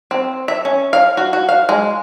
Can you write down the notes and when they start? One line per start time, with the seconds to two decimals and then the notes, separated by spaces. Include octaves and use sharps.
0.11 C4
0.48 E5
0.65 C#4
0.93 F5
1.17 F#4
1.33 F#4
1.49 F5
1.69 G#3